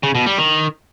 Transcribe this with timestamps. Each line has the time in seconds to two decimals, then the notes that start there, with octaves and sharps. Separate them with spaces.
0.03 C#3
0.15 B2
0.26 G3
0.38 D#3